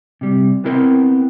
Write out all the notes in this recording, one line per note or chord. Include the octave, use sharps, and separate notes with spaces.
C3 G3
B3 C4 E4 A#4 D#5 G5